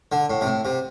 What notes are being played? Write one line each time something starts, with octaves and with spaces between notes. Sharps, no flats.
D3
A2
C3
A2
C3